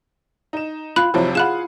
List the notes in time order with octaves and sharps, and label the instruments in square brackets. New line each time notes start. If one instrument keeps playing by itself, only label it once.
[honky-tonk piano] D#4 E7
[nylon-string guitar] F4 [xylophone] B5 F#6 F#7
[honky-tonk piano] F2 C3 F3 [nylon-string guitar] F#3 E4
[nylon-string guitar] F4 [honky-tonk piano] G#4 F5 F#5 [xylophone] B5 F#6 E7